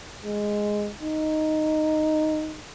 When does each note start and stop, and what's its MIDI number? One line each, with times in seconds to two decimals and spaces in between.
0.24 0.91 56
1.01 2.59 63